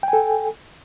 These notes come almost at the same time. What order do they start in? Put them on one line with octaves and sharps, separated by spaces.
G5 G#5 A4